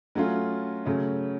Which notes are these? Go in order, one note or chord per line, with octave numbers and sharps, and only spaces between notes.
F#3 A3 C#4 F4
C#3 F#3 A3 C#4